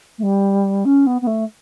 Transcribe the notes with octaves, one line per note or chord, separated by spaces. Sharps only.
A3
G3
C#4
B3
B3
A3